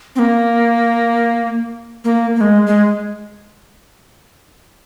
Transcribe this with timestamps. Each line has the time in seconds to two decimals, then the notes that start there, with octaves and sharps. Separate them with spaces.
0.16 C4
0.19 A#3
2.04 A#3
2.36 A#3
2.41 G#3
2.67 G#3